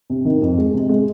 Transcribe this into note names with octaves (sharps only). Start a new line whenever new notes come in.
C3
D#3
F2
G#3
C3
G#3